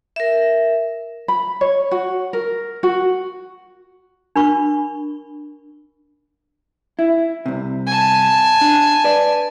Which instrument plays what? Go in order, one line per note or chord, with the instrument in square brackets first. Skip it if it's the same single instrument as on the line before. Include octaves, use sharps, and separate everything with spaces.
[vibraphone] A#4 E5
[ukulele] B5
C#5
F#4
A#4
F#4
[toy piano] D4 A#4 B5 C#6
[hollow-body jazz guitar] E4
C2 C3
[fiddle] G#5 A5
[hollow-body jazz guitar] D4
B4 D5